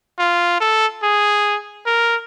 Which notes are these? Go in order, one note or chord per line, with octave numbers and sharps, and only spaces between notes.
F4
A4
G#4
A#4